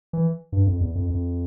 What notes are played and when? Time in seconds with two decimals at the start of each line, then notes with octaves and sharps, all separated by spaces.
0.13 E3
0.52 G2
0.67 F2
0.81 E2
0.95 F2
1.10 F2